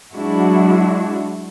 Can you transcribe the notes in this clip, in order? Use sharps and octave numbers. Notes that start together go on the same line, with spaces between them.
F#3 G#3 D4 E4 F#4